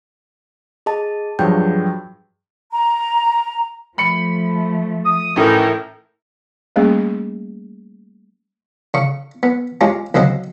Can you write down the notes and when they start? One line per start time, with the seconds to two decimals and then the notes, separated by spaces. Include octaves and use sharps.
0.86 G#4 D#5 A5
1.39 G2 F3 F#3 G#4 G5 G6
2.72 A#5
3.98 F3 A3 B5 C#7
5.05 D#6
5.36 A2 E3 A3 C#4 D#4 E4 A#4
6.76 G3 A3 A#3 C#4 G#4
8.94 C#3 C#6
9.43 B3
9.81 G#3 C#4 F4 G4
10.14 D2 C#3 F#3 C4 D#5